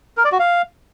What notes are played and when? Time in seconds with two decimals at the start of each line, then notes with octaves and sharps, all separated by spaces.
0.17 A#4
0.25 D5
0.32 F#4
0.39 F5